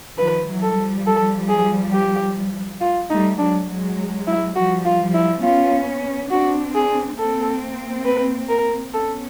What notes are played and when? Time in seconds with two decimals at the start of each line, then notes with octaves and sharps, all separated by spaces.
0.18 D#3 F3 B4
0.48 E3 F#3
0.62 A4
0.77 F3 G3
1.07 A4
1.49 G#4
1.93 G4
2.81 F4
3.10 G3 A3 D#4
3.39 F#3 G#3 D4
3.69 F#3 G#3
4.27 E4
4.55 F3 G3 F#4
4.85 F4
5.00 F3 G3
5.14 E4
5.43 B3 C#4 F4
6.31 C4 D4 F#4
6.75 G#4
7.18 A#3 C4 A4
8.05 B4
8.49 A#4
8.93 B3 C#4 A4